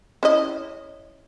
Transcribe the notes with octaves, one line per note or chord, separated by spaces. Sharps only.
C#4 E4 D#5